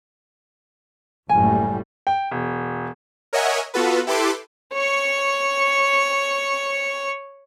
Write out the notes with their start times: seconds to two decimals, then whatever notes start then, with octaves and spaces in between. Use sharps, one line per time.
1.29 F#1 A2 G3 G#5
2.07 G5
2.31 E1
3.33 A#4 C#5 D#5 E5 F#5 G#5
3.74 B3 F4 F#4 A4 B4
4.07 E4 G4 A4 B4 C6 D6
4.74 C#5 C#6